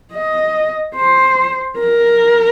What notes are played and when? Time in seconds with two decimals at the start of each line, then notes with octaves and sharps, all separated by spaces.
0.13 D#5
0.96 C5
1.79 A#4